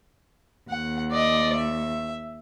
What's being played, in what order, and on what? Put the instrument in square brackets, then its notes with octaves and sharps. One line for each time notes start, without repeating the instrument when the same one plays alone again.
[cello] D#2 [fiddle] F#5
[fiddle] D5 D#5
E5